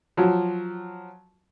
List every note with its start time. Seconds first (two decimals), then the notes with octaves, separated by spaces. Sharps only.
0.17 F3 F#3